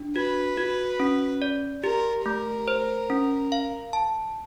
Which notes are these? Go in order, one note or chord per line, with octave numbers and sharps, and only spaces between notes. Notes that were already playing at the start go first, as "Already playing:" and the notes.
Already playing: D4
F#4 B4
F#4
C#4
D5
G4 A#4
A3 A#4
C5
C#4
F5
A5